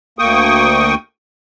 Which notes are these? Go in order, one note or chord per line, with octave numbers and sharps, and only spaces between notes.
D2 A#3 G5 C#6 D#6